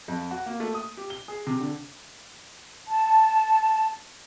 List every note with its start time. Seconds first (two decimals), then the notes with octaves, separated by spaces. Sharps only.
0.08 F2
0.31 F#4
0.46 A#3
0.60 A3
0.74 D#6
0.97 G4
1.10 G7
1.28 G#4
1.47 C3
1.60 D3
2.87 A5